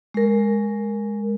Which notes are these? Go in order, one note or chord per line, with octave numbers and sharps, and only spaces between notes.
G#3 A#4